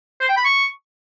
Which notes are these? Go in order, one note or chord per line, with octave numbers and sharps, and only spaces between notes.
C5
G5
B5
C#6